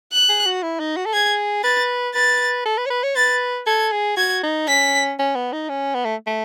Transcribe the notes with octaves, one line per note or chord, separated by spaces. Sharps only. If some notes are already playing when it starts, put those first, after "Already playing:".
F#6
G#4
F#4
E4
D#4
F#4
A4
G#4 G#6
B4 A6
B4 A6
A4
B4
C#5
B4
C#5
B4 A6
A4 G#6
G#4
F#4 G#6
D#4
C#4 B6
C#4
B3
D#4
C#4
B3
A3
A3